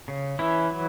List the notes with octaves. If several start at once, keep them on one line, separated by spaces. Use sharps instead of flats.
C#3
E3 C#4 E4
F#3